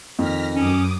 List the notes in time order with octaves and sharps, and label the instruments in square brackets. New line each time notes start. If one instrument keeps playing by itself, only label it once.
[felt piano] F2 D#3 [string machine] F6 A#6 B6
[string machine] F#2 D6 D#6 [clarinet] C#4